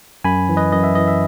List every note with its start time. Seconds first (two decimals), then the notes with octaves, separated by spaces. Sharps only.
0.24 F#2 G#5 B5
0.49 E3
0.57 B4 D#5
0.72 F#2 D#5
0.84 E5
0.95 E3 D#5
1.08 E5